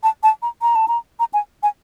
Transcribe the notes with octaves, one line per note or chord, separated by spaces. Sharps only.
A5
A5
A#5
A#5
A5
A#5
A#5
G#5
G#5